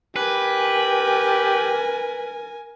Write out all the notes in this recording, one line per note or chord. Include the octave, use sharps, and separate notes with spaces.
G4 A#4 B4 G#5